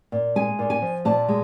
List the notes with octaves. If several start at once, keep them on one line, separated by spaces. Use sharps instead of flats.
A#2
G#3 G#5
A#2
G#5
F3
A#2 A5
G#3